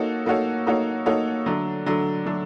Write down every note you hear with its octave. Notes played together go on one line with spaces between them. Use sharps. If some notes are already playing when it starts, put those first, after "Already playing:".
Already playing: A#3 D#4 F#4 A4 C#5
A#3 D#4 F#4 A4 C#5
A#3 D#4 F#4 A4 C#5
A#3 D#4 F#4 A4 C#5
D3 F#3 A3 D4
D3 F#3 A3 D4
D3 F#3 A3 D4